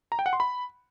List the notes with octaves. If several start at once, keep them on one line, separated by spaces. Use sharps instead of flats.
A#5
G5
F#5
C6
B5